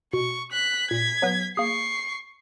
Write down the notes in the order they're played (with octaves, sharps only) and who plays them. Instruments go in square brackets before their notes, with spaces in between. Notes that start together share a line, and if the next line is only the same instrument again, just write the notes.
[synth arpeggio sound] B2 [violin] C#6
[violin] F#6 B6
[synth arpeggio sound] A#2 [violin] G#6 B6
[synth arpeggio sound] F#3 B3 B4
[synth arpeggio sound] A#3 G#4 [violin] C#6 C7